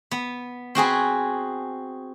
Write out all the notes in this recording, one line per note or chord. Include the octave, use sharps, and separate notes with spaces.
B3
C4 F#4 G#4 B4